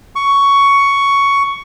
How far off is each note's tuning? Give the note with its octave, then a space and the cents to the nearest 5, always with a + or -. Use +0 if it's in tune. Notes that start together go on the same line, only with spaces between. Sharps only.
C#6 +10